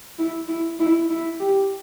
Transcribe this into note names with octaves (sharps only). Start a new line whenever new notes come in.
E4
E4
E4
E4
G4